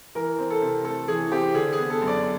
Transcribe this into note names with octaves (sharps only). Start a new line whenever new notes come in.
E3 A#4
C4
A4
C3
A3 A4
E3 G#4
C4 G4
D3 G#4
G#4
B3
A4
F#2
D5